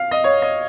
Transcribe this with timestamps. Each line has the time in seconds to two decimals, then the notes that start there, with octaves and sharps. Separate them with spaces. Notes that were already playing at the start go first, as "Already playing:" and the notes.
Already playing: F5
0.11 D#5
0.24 C#5
0.42 D#5